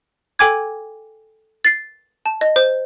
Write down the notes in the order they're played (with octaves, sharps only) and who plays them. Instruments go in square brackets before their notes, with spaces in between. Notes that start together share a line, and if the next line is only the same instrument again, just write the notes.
[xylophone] A4 G5 G#5 D6 G#6
A6 C7
A5
D#5
C5